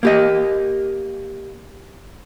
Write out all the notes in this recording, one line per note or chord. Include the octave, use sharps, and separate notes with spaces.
A#3 G4 D#5